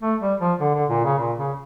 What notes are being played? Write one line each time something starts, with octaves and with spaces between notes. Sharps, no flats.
A3
G3
F3
D3
D3
A#2
C#3
A#2
C#3